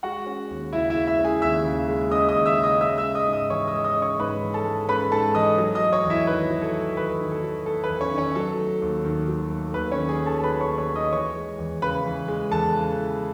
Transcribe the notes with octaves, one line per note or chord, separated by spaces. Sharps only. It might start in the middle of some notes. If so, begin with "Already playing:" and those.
G#3 F#4 F#5
C#4
D#2
C#3 E4 E5
E4 E5
G#3
E4 E5
C#4
G#4 G#5
D#2 E5 E6
C#3
G#3
C#4 D#5 D#6
D#5 D#6
D#2
E5 E6
C#3
D#5 D#6
G#3 E5 E6
E5 E6
C#4
D#5 D#6
G#2
D#5 D#6
E3 C#5 C#6
D#5 D#6
G#3
D#5 D#6
C#4
C#5 C#6
G#2 B4 B5
E3
A4 A5
G#3
C#4 B4 B5
G#2 A4 A5
E3 D#5 D#6
F#3
D#5 D#6
A3
C#5 C#6
E2
E4 E5
D#3 B4
F#3
A4
A3
E2 B4
D#3
A4
F#3
A3 A4
B4
E2
C#4 C#5
D#3
C#4 C#5
F#3 A4
A3
D#2
D#3
F#3
A3
D#2 B4
C#4 C#5
D#3
G#4 G#5
F#3
A4 A5
A5
A3 B4 B5
C#5 C#6
D#2
C#5 C#6
D#3
D#5 D#6
E3 C#5 C#6
G#3
E2
C#3 B4 B5
E3
G#3
E2 A4 A5
C#3
E3